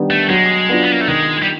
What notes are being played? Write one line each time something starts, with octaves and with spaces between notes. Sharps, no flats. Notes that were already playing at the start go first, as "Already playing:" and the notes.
Already playing: D#3 G3 B3 D4
A3
F#3 G#3
B3 D4 F4
B3
A#3
A3
D#3 G#3
G3